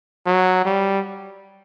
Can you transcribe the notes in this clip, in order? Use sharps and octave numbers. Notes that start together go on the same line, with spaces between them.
F#3
G3